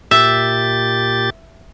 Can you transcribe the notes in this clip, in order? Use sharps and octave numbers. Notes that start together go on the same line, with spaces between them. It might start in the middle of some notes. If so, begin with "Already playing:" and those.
A#2 G4 E5 A6